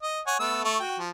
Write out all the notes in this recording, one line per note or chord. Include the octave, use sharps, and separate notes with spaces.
D#5
C#5 F#5 G#5
A3 B3 E6
A3 C#6
F#4 G5
F3